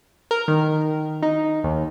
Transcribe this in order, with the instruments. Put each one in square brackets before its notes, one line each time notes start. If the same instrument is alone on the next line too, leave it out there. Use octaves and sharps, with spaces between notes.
[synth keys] A#4
D#3
D#4
D#2